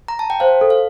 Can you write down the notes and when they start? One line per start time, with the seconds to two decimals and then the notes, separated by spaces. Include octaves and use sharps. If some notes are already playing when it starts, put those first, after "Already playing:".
0.08 A#5
0.19 A5
0.30 G5
0.40 C5 F5
0.61 A4
0.70 F5